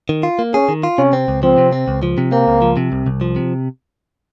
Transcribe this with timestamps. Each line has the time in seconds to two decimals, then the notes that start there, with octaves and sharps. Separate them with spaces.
0.09 D#3
0.23 F4
0.39 A#3
0.54 C#4 G#4
0.69 D#3
0.83 F4
0.98 C3 C#4
1.13 C4
1.28 C#2
1.43 F3 C4
1.58 C3
1.72 C4
1.88 C#2
2.03 F3
2.18 C3
2.32 A#3 C4
2.47 C#2
2.62 F3
2.77 C3
2.92 C2
3.06 C2
3.21 F3
3.36 C3